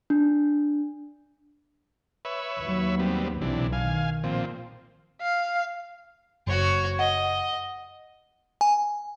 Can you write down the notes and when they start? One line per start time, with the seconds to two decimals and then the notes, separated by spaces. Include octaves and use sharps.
0.10 D4
2.25 B4 C#5 E5
2.60 D#2 F#3
2.99 G3 B3 C4
3.41 B1 C3 E3 D4
3.73 D#3 F5 G#5
4.24 A#2 F3 C4
5.22 F5
6.47 F#1 F#4 C#5
6.99 D#5 F#5
8.61 G#5